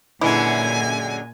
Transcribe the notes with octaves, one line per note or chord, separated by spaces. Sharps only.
F#2 A#2 D3 E3 G#3 G#5